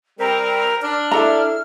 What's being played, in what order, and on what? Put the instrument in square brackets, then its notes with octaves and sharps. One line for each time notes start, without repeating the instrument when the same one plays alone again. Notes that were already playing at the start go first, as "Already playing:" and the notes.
[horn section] G3 C4 [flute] A#4
[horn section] D4 [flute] F6
[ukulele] E4 A4 A#5